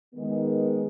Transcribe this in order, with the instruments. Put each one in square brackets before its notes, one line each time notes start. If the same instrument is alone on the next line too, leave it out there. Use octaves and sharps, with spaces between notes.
[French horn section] D#3 G#3 B3